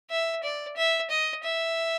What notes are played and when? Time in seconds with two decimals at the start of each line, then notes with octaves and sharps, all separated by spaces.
0.11 E5
0.43 D5
0.77 E5
1.10 D#5
1.44 E5